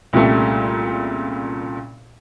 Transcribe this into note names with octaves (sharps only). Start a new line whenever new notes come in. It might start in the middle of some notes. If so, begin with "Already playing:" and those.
C2 A#2 C#3 G3 A3